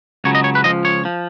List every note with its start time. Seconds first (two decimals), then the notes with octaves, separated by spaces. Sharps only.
0.24 C#2 C#3 F#3 C#5
0.35 D#5
0.44 C#5
0.55 B4
0.64 C#2 C#3 F3 D#5
0.85 C#5
1.05 F3